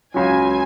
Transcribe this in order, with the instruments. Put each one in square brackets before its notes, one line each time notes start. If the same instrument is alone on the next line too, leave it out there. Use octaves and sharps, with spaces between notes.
[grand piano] C#2 C#3 F#3 [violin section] G#5